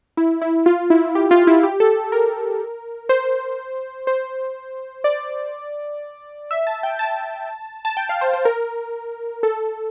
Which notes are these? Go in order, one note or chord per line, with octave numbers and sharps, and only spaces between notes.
E4
E4
F4
E4
G4
F4
E4
G4
A4
A#4
C5
C5
D5
E5
A5
G5
A5
A5
G5
F5
C5
C5
A#4
A4